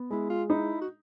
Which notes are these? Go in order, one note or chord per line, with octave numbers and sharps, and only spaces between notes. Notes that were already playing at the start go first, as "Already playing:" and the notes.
Already playing: B3
G#3 E4
F4
D#4 E4
F#4